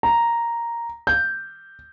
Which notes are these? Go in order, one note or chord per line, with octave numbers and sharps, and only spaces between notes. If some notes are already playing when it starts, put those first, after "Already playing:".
A#5
G6